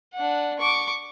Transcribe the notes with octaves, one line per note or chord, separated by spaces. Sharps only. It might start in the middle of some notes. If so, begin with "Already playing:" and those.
D4 F#5
C#6 D6